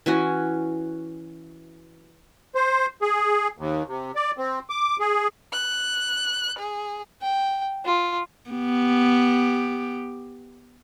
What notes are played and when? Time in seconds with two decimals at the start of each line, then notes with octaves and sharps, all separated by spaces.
0.06 E3 C#4 F#4
2.55 C5
3.02 G#4
3.58 D#2
3.88 C3
4.15 D5
4.38 C4
4.70 D6
5.00 G#4
5.53 F#6
6.59 G#4
7.22 G5
7.85 F4
8.50 B3 G4